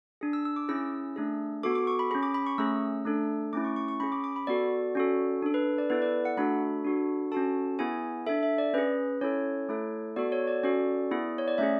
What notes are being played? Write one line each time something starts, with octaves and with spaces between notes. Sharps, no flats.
D4 G#4
E6
E6
D6
C#4 E4 G#4 E6
A3 D4 G#4
B3 F#4 A4 D6
D6
C#6
B5
C#4 G#4 B5
D6
B5
C#6
A3 C#4 G#4 E6
A3 D4 A4
A3 C#4 E4 D6
C#6
C#6
C#6
C#4 G#4 B5
D6
D6
B5
B3 F#4 A4 D5
C#4 F#4 A4
D4 A4
B4
D5
B3 E4 A4 B4
D5
F#5
A3 D4 F#4 A4 B5
D4 F#4 A4
C#4 F#4 A4 A5
B3 E4 G#4 G#5
D4 A4 E5
E5
D5
C#4 G#4 B4
C#4 E4 A4 C#5
A3 E4 A4
B3 F#4 A4 D5
C#5
D5
C#4 F#4 A4 D5
B3 E4 G#4
C#5
D5
A3 C#4 G#4 E5